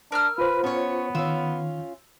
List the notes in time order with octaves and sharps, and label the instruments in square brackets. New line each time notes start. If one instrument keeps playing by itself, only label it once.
[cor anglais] D4 [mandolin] A#4 E6 F6
[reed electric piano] F4 C5 [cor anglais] B4
[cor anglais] B3 [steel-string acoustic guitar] C#4 C#5
[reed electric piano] D#3 [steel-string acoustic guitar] C#4 F4 [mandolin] E6